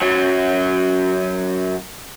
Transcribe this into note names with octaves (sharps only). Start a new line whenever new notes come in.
F#2 F#3